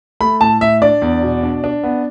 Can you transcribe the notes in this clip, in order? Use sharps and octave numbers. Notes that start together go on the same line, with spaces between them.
A3 B5
A2 A5
A2 E5
D4 D5
E2
B2
D4
D4
B3